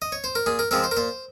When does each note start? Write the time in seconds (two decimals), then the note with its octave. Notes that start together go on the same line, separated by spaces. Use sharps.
0.02 D#5
0.12 C#5
0.24 C5
0.35 A#4
0.46 A#2 G#4
0.59 A#4
0.71 F3 G#3 C4 A#4
0.84 C5
0.91 A#4
0.97 A#2 C5